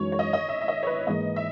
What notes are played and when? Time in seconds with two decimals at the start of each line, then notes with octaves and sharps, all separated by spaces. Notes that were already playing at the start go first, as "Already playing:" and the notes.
Already playing: F#2 E3 G#3 D#4 F#4 C#5
0.12 C#5
0.19 D#5
0.33 D#5
0.49 E5
0.62 E5
0.68 D#5
0.83 C#5
0.87 B4
1.07 G#2 E3 A#3 D#5
1.36 E5